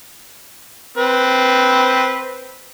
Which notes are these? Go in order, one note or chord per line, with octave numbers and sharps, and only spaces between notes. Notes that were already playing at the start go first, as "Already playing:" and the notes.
C4 B4